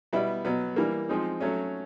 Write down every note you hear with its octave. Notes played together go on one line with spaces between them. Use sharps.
B2 G3 B3 E4
B2 F#3 B3
E3 G3 A#3
F3 G#3 C4 D#4
F#3 A3 C#4